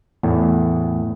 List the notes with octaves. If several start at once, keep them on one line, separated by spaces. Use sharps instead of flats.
E2 A2